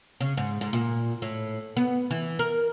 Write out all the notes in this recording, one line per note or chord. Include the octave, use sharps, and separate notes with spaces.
C#3
G#2
G#2
A#2
A2
B3
E3
A#4